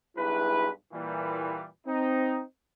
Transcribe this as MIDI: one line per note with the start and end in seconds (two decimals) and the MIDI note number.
0.17 0.69 35
0.17 0.69 43
0.17 0.69 64
0.17 0.69 68
0.17 0.69 71
0.93 1.66 46
0.93 1.66 52
0.93 1.66 55
1.87 2.41 60
1.87 2.41 63